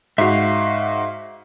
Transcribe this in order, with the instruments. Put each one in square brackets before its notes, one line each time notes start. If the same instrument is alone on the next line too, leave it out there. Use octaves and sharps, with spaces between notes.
[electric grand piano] G#2 F#4 [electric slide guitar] E5 F5